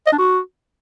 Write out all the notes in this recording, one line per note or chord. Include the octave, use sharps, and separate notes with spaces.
D#5
D4
F#4